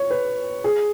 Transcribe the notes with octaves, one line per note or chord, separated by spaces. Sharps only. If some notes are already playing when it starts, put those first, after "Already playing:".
Already playing: C#5
B4
G#4